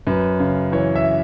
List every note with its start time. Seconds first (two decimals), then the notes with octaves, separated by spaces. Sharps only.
0.07 F#2 B4
0.40 C#3
0.72 E3 C#5
0.96 E5